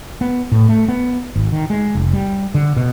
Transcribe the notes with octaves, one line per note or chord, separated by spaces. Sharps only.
B3
A2
A3
B3
G#1
D#3
G#3
F1
G3
D3
B2